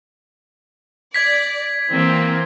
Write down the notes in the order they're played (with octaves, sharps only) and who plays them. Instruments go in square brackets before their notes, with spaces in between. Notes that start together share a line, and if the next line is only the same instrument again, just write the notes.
[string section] D5 [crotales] G#6 B6
[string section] E3 A#3 C4